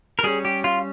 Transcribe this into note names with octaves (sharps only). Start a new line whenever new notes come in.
A#4
G3 C#4 G#4
G4
F4